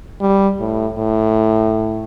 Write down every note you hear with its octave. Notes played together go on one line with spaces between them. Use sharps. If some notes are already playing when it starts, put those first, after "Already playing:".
G3
A2
A2